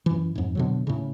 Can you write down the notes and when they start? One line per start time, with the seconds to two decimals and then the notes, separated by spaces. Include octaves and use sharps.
0.06 F#2 E3
0.35 F2 G#2
0.55 B2 D3 F#3
0.87 A2 C#3